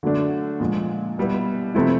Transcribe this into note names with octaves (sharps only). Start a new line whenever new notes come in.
D3 F#3 A3 D4
A#2 F3 G#3
B2 G3 B3 E4
C3 F3 A3 C4 E4